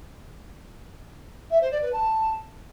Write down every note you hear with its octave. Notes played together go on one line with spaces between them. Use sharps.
E5
C5
D5
B4
A5